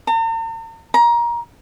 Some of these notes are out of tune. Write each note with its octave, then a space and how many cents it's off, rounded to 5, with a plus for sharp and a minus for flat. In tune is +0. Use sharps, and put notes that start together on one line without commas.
A#5 -45
A#5 +20